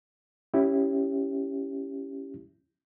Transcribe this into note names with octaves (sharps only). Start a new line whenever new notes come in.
C#4 E4 G4